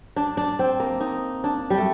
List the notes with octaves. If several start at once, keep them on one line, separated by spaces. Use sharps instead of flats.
D4
D4
C4
A#3
D#4
D4
G3
A3